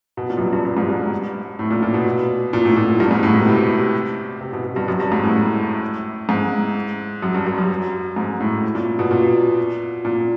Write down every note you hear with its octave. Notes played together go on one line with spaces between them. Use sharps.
B2
A#2
F#2
G2
G2
G2
G#2
G2
A2
A#2
A#2
B2
A#2
A2
A#2
G2
G#2
A2
B2
C3
C3
B2
B2
G2
F#2
G2
G#2
A2
G#2
F#2
G2
G2
F#2
G#2
A2
A#2
B2
A#2
A#2